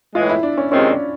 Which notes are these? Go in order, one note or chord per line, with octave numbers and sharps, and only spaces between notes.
A2 E3 G#3 F4
E4
D4
C#4
C3 D#3 G#3 C4 C#4 F4
D4